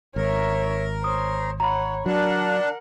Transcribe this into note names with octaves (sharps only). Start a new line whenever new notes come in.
G#1 A#4 C#5 E5
C5 C#5 D#6
C#5 F#5 A#5 B5
F#3 D4 A#4 F#5